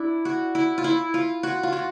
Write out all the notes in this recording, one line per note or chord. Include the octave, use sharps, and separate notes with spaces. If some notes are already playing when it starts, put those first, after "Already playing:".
Already playing: D4 E4
F#4
E4
F4
E4
F4
F#4
F4
F#4